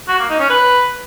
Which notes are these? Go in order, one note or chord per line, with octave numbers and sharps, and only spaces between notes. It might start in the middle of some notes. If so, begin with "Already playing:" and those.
F#4
A#3
D#4
C#4
B4